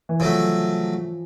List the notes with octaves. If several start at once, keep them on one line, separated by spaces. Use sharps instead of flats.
E3
C#3 F3 F#3 A3